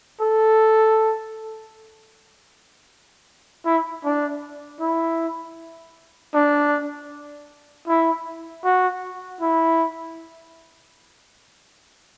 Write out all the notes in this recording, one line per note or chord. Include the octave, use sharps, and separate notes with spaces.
A4
E4
D4
E4
D4
E4
F#4
E4